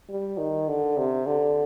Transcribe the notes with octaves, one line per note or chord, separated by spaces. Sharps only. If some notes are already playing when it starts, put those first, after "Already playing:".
G3
D#3
D3
C3
D3